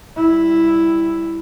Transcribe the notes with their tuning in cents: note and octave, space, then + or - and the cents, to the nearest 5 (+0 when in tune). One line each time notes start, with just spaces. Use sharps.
G3 +0 E4 +0